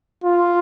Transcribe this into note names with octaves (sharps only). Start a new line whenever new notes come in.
F4